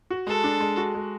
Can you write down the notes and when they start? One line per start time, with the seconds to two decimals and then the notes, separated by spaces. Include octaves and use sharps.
0.10 F#4
0.27 G#3 A4
0.44 D4
0.60 G#3
0.77 F#4
0.95 G#3